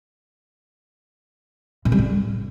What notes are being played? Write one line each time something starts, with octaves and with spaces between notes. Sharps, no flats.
A#2
G3
A2